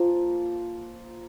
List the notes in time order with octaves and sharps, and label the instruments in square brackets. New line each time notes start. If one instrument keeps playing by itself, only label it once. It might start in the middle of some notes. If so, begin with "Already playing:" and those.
Already playing: [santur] F3 A#3 F4